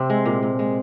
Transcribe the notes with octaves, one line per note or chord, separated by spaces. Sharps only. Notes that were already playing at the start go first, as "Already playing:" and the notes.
Already playing: C3 C4
G#3
A#2
A#2
G#3